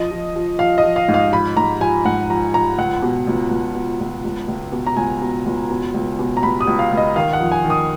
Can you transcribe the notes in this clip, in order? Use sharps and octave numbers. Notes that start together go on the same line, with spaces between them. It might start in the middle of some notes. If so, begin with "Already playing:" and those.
Already playing: F3 D#5
F3
F3
F3 F5
D#5
F3
F5
G#2
F5
F3 B5
G#2 A#5
F3 G#5
G#2 F#5
F3 A#5
F3 A#5
C#2 F#5
B2
C#2
C#2
B2
C#2
C#2
C#2
B2
A#5
C#2 G#5
B2
C#2
B2
C#2
B2
A#5
C#2 B5
D#6
C#2
F5
C#2
D#5
D#3 F5
F#5
F2
G#5
D#3
D#6